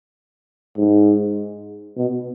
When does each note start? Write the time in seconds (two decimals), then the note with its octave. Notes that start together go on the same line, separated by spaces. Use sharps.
0.77 G#2
1.98 B2